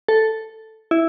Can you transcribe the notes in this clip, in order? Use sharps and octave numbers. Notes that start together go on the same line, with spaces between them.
A4
E4